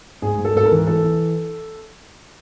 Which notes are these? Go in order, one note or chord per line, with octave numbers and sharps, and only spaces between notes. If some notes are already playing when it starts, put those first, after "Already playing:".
G#2 G#4
G#2
A4
G#2 A4
A#4
E3
E3 A4
E3